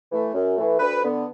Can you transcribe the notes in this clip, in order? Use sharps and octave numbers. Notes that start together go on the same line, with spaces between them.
E3 A3
F#2
E3 A3
D2 B4
D3 B3